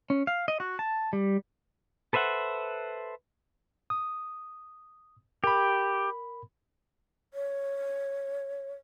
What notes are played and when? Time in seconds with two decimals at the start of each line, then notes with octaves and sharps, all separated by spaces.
0.10 C#4
0.27 F5
0.48 D#5
0.60 F#4
0.79 A5
1.13 G3
2.13 A4 B4 C5 E5 F#5
3.90 D#6
5.44 G4 A#4 B5
7.34 C#5